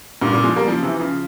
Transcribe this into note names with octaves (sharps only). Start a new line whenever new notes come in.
G2 A#2
A#2 C#3
F3 G#3
G3 A#3
C#3 F3
C3 E3
C#3 F3